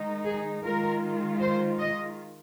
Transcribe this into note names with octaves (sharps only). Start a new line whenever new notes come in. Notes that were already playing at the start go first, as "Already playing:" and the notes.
Already playing: D#3 G#3 D#4
G#4
D#3 G#3 F4 A#4
C5
D#5